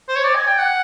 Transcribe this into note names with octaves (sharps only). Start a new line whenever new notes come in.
C5
C#5
D5
G#5
G5
F#5